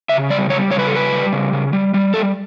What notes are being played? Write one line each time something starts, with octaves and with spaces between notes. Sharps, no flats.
C#3 E5
G3 D5
G3 C#5
C#3 C#5
B4
A4
G3 B4
G3
C#3
C#3
G3
G3
G3 A4